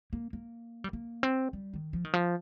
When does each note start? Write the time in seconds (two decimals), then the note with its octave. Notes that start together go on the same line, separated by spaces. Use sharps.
0.13 A#3
0.33 A#3
0.84 G3
0.93 A#3
1.23 C4
1.53 G3
1.74 D#3
1.93 F3
2.05 D#3
2.13 F3